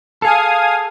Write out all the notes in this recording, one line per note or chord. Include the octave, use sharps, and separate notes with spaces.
G#4 A4 F5 G#5 D#6